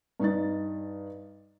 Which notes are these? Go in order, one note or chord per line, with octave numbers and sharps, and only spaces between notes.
G2 D#4 D#5 A6